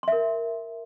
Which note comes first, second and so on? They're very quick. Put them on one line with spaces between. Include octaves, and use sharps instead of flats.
C6 E5 A#4